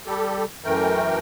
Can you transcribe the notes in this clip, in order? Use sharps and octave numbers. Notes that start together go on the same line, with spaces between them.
G3 G4 A4
F#2 E3 A3 A#4 G5